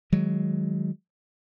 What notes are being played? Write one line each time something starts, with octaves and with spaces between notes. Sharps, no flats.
D#3 F#3 G#3